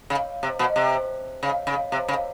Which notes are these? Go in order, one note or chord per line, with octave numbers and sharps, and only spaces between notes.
C#3
C3
B2
C3
C#3
C#3
C3
C#3